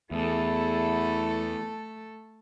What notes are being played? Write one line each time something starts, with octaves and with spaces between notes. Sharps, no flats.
E2 A3 E4 A4